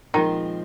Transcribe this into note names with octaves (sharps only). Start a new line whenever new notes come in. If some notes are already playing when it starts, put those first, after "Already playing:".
A#2 D#3 F3 G#3 C4